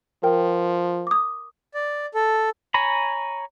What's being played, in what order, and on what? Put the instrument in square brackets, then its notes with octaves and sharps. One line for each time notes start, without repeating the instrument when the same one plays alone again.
[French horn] F3 [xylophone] A#4 G5
[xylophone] D6 D#6
[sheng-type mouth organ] D5
A4
[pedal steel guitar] C#5 G#5 A#5 B5